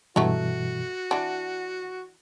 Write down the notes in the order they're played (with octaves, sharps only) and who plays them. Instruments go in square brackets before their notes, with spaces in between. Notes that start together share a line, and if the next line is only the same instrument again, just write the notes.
[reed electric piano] G2 B2 E3 [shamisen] F#3 A3 [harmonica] F#4
[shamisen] E3 D4 [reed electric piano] F#5